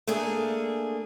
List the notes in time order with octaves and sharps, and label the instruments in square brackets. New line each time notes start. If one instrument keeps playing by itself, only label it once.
[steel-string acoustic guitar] A3 A#3 D4 G#4